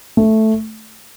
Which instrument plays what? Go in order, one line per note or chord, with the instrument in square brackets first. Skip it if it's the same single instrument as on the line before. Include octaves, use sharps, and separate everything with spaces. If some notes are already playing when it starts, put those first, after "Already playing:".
[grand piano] A3